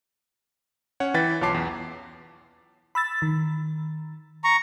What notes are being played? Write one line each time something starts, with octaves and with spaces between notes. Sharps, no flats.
C#4 C#5 F#5
E3 B4 G5 A6 B6
B1 F4 C#5 A5 D6 C7
E2
B5 E6 A6
D#3
A#5 C#6